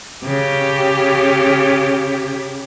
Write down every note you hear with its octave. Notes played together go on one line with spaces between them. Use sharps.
C#3 G4